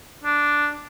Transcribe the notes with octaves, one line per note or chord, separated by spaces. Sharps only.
D4